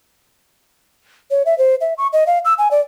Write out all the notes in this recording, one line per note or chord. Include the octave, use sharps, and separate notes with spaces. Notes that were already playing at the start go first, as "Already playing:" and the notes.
C#5
E5
C5
E5
C#6
D#5
F5
E6
G#5
D5